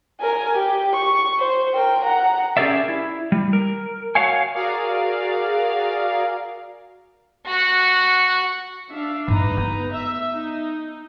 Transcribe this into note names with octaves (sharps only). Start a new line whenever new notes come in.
A#4 G#5
G4
C#6
C5
A#4 G5
F#5 A#5
C#4 G4 G#4 A#4 D5 E5
E4
G3
A#4
F#4 C#5 F5 F#5 G#5
F#4 G#4 A#4 D5 F5
F#4 F#5
D4 E5 F5
G2 D#4 B4 A#5
B3
E5
D#4